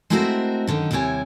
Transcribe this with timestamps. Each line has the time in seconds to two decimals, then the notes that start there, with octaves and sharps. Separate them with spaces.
0.10 G#3 A3 C4 E4 F#4 A#4
0.67 F#2 D3 D#3 D#4
0.91 D#2 C3 G3 E4 C#5 G#5